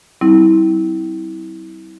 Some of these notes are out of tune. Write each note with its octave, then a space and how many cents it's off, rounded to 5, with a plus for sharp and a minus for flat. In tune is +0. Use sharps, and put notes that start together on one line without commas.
G3 -35 C4 +0 E4 -25